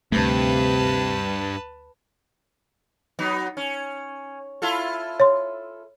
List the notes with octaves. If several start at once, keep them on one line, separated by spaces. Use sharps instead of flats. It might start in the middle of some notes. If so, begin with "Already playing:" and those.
D2 G2 C3 A3 B4 A5
F#3 B3 D#4
C#4
E4 F4 A4
C#5 C6